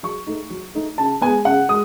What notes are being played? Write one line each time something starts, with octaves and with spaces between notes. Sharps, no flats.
F#3 C#6
A3 D#4
F#3
A3 D#4
C#3 A5
G#3 B3 G#5
C#3 F#5
G#3 D#6